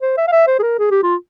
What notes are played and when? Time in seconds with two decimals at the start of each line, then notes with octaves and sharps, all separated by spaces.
0.02 C5
0.18 E5
0.28 F5
0.32 E5
0.47 C5
0.59 G#4
0.63 A#4
0.79 G#4
0.91 G4
1.03 F4